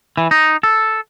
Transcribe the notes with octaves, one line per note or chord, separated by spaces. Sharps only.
E3
D#4
A4